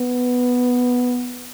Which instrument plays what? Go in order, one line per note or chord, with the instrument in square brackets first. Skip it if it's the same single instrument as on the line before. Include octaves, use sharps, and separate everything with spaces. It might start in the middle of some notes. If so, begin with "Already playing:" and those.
Already playing: [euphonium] B3